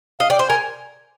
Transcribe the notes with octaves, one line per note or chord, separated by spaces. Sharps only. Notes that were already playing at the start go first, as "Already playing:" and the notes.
D#5 F5
D5 G5
C5
A#4 G#5